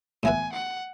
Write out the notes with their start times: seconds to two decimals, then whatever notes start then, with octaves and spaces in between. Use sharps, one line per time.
0.23 A2 E3 B3 E4 B4 G#5
0.53 F#5